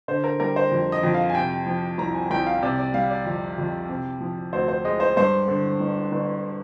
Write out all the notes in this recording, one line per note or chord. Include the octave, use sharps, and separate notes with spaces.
D3 C5
A#4
G3 A#4
C5
F2
D#5
F2
F5
G#5
C3 G5
F3
C2 A#5
G#5
C2 G5
F5
C3 D5
D5
G3 F5
D5
F2
F2
C3
F3
D2 C5
C5
G#3 D#5
C5
G2 C5
D3
G1
G1